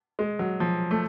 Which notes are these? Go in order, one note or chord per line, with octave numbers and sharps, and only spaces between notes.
G#3
F#3
F3
A3